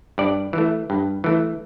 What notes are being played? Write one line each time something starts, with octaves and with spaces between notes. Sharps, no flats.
G2 D5
E3 A3
G2
E3 A3